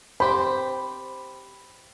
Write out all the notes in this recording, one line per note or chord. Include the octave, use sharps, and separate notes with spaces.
C4 G4 C5 B5